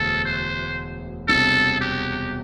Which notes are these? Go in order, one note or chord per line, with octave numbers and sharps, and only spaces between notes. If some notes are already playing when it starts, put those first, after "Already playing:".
Already playing: E1 D2 D3 A4
C5
E1 E2 C3 G3 D4 A4
G4